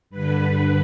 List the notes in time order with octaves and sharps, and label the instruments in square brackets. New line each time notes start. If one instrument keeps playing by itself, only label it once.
[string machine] G2 D3 B4